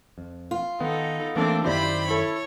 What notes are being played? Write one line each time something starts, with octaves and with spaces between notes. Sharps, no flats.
F2
F4
D#3 B3 D#4 A4
E3 A3 A#3 C4 D4 A4
F#2 D#3 E4 G4 C5 D5 B5
E4 A4 C#5